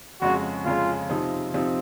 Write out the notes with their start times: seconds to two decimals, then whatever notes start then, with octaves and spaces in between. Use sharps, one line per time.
0.21 F2 C#3 G#3 C#4 F#4
0.66 F2 C#3 G#3 C#4 F4
1.09 C3 F3 C4 D#4
1.54 C3 F3 C4 D#4